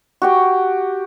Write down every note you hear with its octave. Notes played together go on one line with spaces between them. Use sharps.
F#4 G4 G5